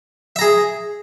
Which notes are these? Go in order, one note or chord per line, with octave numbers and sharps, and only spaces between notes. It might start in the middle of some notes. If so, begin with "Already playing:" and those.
G#4 E5 A#5